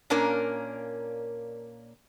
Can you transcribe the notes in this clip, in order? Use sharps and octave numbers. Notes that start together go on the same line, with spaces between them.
A#2 A#3 C#4 D4 A#4